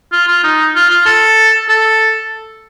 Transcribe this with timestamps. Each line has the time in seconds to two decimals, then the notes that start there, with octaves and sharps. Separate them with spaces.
0.12 F4
0.28 F4
0.44 D#4
0.75 F4
0.90 F4
1.06 A4
1.69 A4